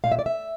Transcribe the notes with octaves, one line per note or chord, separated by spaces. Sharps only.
A#2 F5
E5
D5
E5